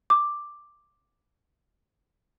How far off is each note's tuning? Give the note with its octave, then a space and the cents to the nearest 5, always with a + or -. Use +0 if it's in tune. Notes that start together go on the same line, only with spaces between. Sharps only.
D6 +5